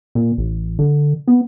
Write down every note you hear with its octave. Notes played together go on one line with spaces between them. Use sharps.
A#2
A1
D3
B3